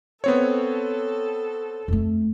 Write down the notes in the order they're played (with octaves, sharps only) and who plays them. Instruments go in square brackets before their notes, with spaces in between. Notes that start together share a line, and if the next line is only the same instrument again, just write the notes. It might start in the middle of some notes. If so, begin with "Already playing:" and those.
[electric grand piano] B3 C4 C#5 [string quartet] A4
[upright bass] F2 A3